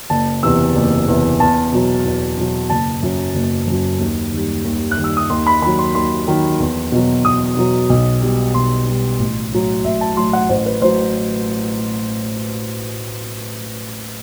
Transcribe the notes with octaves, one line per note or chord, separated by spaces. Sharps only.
F#1 A5
E2 C3 E3 E6
F#1
E2 C3 E3
E2 A5
B2 F#3
E2
B2 F#3
F#1 A5
F#2 F#3
F#1
F#2 F#3
D#2
D#3 G3
D#2
F#6
D#3 G3
E6
D#6
D#2 C6
B5
D#3 F#3 B5
C6
D#2 C6
D#3 F#3
E2
B2 F#3
E2 D#6
B2 F#3
B1
B2 G3
B1 C6
B2 G3
A1
A2 F#3
A1 E5
A5
A2 F#3 C6
F#5
A1 C5
B4
A2 F#3 C5